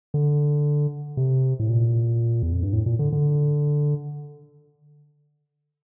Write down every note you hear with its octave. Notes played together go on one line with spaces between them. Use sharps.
D3
C3
A2
A#2
E2
F2
G2
A2
A#2
D3
D3